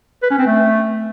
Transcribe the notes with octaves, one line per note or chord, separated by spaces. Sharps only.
B4
C#4
C4
A3